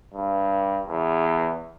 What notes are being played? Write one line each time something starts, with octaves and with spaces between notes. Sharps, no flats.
G2
E2